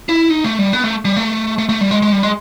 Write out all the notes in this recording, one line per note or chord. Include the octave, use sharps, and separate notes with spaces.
E4
D#4
A3
G3
B3
A3
G3
A3
A3
A3
G3
G#3
G#3
G3
G#3